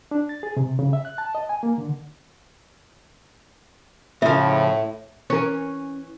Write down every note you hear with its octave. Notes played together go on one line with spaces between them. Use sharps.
D4
A6
G#4
C3
C#3
E5
F#6
A5
D#5
G#5
A#3
D3
A2 C#3 F3 E5
E3 C#4 A#4